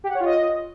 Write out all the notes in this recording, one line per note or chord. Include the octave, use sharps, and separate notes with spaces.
G4
F#5
C#5
F4
D#5